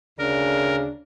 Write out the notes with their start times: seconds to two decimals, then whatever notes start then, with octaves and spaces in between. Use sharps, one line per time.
0.19 D2 C#3 D4 A#4